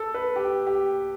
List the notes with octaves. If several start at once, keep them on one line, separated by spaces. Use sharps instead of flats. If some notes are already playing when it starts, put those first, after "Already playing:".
Already playing: A4
B4
G4
G4